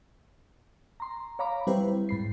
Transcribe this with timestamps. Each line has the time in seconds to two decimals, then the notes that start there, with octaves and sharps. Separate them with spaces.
1.00 A#5 C6
1.39 C#5 F5 A#5 B5 D6
1.67 G3 C4 E4 G4 B4 C5
2.09 G#2 B5 C7